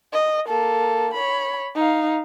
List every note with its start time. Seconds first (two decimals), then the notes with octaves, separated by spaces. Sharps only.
0.13 D#5
0.47 A#3 A4
1.14 C#5 B5
1.75 D#4 F5